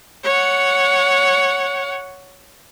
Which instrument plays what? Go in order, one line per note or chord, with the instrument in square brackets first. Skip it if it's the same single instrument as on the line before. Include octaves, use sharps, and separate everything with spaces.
[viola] C#5 F#5